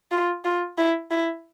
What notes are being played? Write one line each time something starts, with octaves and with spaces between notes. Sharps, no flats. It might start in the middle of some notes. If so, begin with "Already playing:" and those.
F4
F4
E4
E4